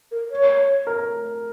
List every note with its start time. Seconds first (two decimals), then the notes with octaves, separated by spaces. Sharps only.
0.11 A#4
0.31 C#5
0.87 A#4